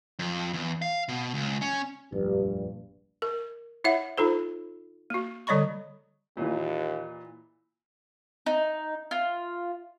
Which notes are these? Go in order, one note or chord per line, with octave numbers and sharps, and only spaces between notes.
F2
E2
F5
B2
C#2
C#4
F1 A#1 G2
A#4
E4 C#5 E5 F#5
D#4 F4 A4 C5
A#3 F#4
D3 G3 C#5 D#5 B5 C#6
D#2 A#2 E3
D#4
F4